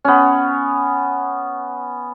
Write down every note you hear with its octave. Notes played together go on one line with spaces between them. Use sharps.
B3 C#4